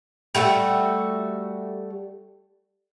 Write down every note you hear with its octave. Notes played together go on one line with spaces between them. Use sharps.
G3 A3 F#4 A4